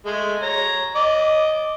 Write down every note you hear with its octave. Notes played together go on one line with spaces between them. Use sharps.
G#3 A3 G#4
C#5 A#5
D#5 D6